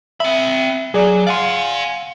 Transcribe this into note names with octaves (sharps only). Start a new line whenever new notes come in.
C4 E5 B5
F#3 G#4 D5
D5 F5 F#5 G#5 C6